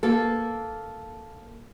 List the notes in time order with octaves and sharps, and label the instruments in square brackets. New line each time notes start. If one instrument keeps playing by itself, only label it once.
[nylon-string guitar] A#3 A4